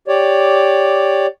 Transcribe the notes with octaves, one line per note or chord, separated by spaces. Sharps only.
G4 C#5 D5